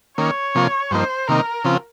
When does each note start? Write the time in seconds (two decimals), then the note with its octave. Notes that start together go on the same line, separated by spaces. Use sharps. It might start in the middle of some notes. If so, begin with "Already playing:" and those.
0.18 D#3 A#3 C#4 C#5
0.55 C3 F3 A#3 F4
0.91 G2 F3 A#3 D#4 C5
1.28 C3 D#3 A#3 D#4 A#4
1.64 C#3 F3 C4 F4